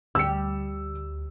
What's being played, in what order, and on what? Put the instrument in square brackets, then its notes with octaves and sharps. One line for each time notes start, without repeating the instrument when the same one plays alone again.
[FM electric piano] D2 [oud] G3 G4 [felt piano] E6 C#7